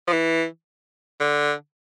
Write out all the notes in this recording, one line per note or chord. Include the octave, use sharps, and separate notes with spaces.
F3
E3
D3